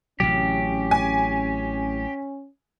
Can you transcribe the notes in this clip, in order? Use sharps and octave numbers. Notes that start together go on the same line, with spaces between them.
A1 C3 F#3 C#4 G4
G#5